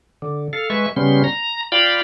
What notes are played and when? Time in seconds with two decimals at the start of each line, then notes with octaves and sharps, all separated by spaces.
0.22 D3
0.53 A4 F5
0.70 G#3 B4 E5 C#6
0.96 C#3 G3 B3 C#4 C6
1.24 A#5
1.72 F4 D5 F5 G5 B5